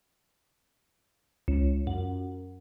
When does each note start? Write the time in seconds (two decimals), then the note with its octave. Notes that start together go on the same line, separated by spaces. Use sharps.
1.48 C#2
1.87 F#2